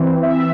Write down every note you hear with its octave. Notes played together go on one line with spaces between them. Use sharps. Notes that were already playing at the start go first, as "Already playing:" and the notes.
Already playing: E3 C4
E5